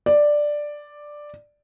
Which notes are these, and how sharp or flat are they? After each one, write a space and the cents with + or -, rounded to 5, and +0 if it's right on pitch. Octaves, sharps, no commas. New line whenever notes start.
D5 +5